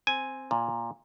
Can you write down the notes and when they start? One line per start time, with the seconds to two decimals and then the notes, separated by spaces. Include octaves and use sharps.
0.07 C4 G#5
0.51 A#2